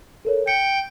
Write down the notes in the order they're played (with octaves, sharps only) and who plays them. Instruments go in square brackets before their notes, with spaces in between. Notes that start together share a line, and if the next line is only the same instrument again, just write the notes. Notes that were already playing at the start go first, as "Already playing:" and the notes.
[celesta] A4 A#4 C#5
[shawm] G5 [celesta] C#7